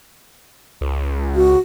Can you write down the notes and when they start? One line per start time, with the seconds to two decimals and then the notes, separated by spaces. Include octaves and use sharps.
0.81 C#2
1.36 F#4